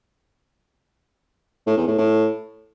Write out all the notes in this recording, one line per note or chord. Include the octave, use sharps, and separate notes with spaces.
A2
E2
A2
A2